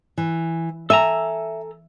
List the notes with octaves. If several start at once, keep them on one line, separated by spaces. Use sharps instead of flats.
E3
A4 E5 G#5 A#5